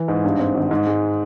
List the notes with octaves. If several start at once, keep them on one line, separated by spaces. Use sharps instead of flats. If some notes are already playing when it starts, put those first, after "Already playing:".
Already playing: E3
G#2
G2
C4
G#1
G#2
G#3